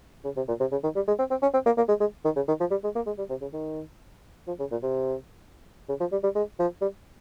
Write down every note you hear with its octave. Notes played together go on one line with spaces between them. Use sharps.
C#3
C3
A#2
C3
C#3
D#3
G3
G#3
C4
C4
C#4
C4
A#3
A#3
G#3
G#3
D#3
C#3
D#3
F3
G3
G#3
A#3
G#3
G3
C3
C#3
D#3
F3
C#3
A#2
C3
C#3
F3
G3
G3
G#3
F3
G3